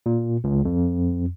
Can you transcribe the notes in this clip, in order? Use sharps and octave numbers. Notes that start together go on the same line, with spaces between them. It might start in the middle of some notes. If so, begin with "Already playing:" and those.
A#2
C#2
F2